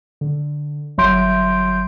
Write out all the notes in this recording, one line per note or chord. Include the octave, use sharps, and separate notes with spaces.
D3
G1 F#3 E5 C6 G6 D7